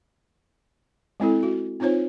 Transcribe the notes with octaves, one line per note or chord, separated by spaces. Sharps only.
G#3 C4 E4 A4
F#4
C4 D#4 F4 C5 C#5